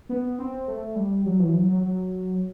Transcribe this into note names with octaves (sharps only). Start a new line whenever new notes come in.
B3
C4
A3
G3
F#3
E3
F#3
F#3
F#3